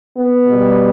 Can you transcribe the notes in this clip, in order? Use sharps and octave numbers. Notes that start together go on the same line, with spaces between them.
B3
B2 G3